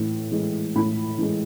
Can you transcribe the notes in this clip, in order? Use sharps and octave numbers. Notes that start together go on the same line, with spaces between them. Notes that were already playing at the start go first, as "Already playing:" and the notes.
Already playing: A2 E3
E3 G#3
A2 B5
E3 G#3